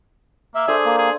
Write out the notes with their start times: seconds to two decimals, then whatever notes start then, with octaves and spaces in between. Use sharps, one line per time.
0.55 A#3 E5
0.68 D4 G#4 A4 C5
0.85 A#3
0.98 G#4